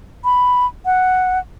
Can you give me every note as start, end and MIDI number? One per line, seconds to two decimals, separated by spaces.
0.24 0.66 83
0.86 1.39 78